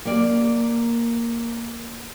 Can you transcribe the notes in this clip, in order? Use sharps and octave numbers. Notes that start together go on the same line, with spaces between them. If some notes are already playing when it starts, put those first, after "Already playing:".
A#3 D5